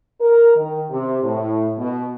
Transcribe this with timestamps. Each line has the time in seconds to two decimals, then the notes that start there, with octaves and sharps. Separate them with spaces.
0.21 A#4
0.56 D#3
0.90 C3
1.23 A2
1.78 B2